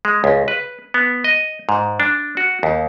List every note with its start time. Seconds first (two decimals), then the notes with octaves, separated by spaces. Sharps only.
0.05 G#3
0.24 C#2
0.48 B4
0.94 B3
1.24 D#5
1.69 G#2
2.00 D4
2.37 F#4
2.63 D#2